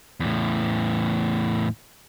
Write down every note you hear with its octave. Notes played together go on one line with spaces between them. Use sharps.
E2 A2